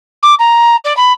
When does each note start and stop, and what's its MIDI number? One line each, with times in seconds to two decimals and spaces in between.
0.22 0.35 86
0.39 0.76 82
0.84 0.95 74
0.97 1.12 83